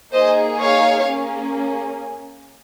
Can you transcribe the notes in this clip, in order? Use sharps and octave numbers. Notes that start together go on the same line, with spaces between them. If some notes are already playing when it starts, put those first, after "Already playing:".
A#3 D#4 G#4 C5 D#5
C#5 F5
A#3 C#4 G#4